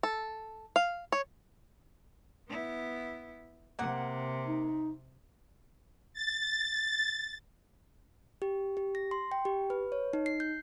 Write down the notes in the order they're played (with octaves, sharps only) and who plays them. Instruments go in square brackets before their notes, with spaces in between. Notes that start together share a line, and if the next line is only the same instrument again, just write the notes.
[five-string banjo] A4
F5
C#5
[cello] B3 E4
[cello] C3 [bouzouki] A#3 F#5
[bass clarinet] D#4
[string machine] A6
[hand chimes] G4
G4
A#6
C6
G5
G4
B4
C#5
D#4
C7
G6